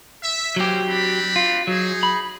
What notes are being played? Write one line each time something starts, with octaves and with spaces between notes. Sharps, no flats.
E5
F#3 A#3 C#4 G4 C5
C4 D4 B5
F4
F#3 D#4 G#4
B5